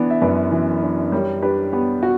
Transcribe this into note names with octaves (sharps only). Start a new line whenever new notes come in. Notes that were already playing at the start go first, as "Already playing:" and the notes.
Already playing: E3 B3 D4 D5
E5
F#2 B4 D5
E3
D4
G3 A#4 C#5
D4 G4 B4
B3 G4
F#4